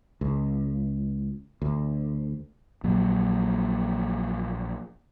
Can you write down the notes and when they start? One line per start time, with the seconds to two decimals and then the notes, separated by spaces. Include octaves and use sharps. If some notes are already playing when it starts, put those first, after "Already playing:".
0.21 C#2
1.62 D2
2.84 A#1 A#2 F#3